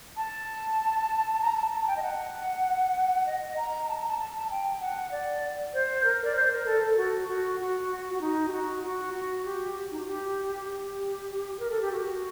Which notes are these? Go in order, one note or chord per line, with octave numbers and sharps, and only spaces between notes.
A5
A#5
A5
A5
A5
G5
D#5
F#5
D#5
A#5
A5
A#5
A5
A5
G5
F#5
D5
C5
A#4
D5
C5
A#4
A4
A4
F#4
F#4
F#4
F#4
D#4
G4
F#4
F#4
F#4
G4
D#4
F#4
G4
G4
A#4
A4
G4
F#4